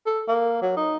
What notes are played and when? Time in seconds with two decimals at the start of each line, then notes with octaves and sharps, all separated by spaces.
0.07 A4
0.28 A#3
0.62 F#3
0.77 D#4